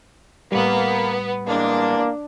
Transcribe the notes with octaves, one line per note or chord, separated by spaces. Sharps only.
A2 G3 A#3 B3
E2 G2 G#3 A#3 D4